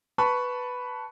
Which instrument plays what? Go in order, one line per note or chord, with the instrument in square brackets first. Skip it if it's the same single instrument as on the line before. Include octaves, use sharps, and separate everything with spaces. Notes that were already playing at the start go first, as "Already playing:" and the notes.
[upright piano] B4 A5 B5 C#6